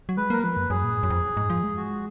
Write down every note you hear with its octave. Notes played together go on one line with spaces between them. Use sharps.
F#3
G#3 B4
A#3 A#4
F3 B4
F#2
F#2 G#4
A#2
G#2
F#2
F2
G#2
F3
G#3
F#4